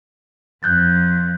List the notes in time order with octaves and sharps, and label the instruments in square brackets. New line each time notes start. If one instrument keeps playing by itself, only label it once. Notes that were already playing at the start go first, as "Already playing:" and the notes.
[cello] F2 [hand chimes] F#6 G6 A6